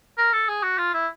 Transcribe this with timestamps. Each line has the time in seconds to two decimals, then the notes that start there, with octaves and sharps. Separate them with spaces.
0.18 A#4
0.33 A4
0.49 G#4
0.63 F#4
0.78 F4
0.94 E4